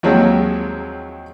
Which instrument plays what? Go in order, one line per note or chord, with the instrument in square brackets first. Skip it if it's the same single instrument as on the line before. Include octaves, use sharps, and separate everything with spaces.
[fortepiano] D#2 F3 F#3 G#3 C4